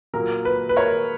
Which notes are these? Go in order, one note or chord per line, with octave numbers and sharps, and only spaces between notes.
A#2 F#3 A#3 A#4
B4
B4
A#4 C#5